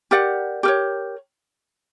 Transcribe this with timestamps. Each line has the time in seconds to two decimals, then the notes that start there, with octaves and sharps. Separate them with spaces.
0.11 G4 A#4 D5 F#5
0.63 G4 A#4 C#5